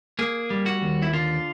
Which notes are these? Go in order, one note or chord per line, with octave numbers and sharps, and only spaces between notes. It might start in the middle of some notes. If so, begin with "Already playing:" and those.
A#3 G#4
G3
F#4
D#2
E4
D3 F4